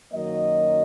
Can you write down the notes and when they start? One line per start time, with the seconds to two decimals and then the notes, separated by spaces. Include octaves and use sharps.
0.13 F#2 D#3 F#3 A#3 D#5